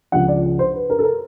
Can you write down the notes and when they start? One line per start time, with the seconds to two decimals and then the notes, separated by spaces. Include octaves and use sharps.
0.12 C#2 C#3 F3 F#5
0.28 D5
0.59 C5
0.74 B4
0.90 A#4
0.99 A4
1.04 A#4